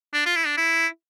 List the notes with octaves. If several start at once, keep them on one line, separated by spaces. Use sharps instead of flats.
D4
F4
E4
D4
E4